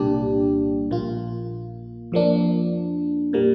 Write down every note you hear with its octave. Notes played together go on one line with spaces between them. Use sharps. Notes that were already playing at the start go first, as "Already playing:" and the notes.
Already playing: C2 A#2 G3 D4 G4
A#1 A#2 A#3 F4
F2 F3 A#3 D4
A#2 G3 A#3